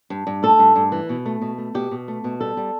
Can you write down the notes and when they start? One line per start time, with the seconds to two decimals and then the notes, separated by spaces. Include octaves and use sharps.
0.10 G2
0.27 G2
0.43 A3 A4
0.59 G2
0.76 G2
0.92 E3
1.09 B2
1.26 A3
1.42 B2
1.58 A3
1.75 B2 G4
1.91 B2
2.08 A3
2.24 B2
2.41 G3 A4
2.57 G3